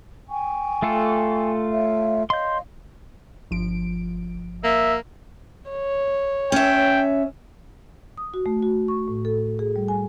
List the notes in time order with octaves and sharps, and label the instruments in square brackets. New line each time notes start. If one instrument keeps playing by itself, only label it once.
[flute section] G5 G#5 C#6
[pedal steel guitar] A3 F4 A4
[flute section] C#5 E5 F5
[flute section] C#5 D#5 F5 [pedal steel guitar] C6 G6
[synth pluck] G1 F3 D7
[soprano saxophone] A#3 [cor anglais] E5
[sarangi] C#5
[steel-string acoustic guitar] C#4 E5 [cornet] G5
[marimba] D#6
F#4
A3
F#4
C#6
A2
A4
G#4
G3
G#5